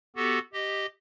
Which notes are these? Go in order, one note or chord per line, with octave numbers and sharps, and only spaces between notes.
B3 F#4 G4 A4
G4 D#5